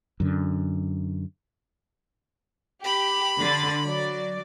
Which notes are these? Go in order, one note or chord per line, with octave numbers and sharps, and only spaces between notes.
F#2 D3
G4 B5
D3 C6 A6
F#3 D5